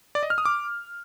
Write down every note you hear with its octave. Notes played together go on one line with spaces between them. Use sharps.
D5
D#5
F6
D#6
D6